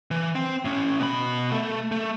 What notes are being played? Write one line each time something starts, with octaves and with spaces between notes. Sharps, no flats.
E3
C4
A2 C#4
B2 B5
A3 A4
A3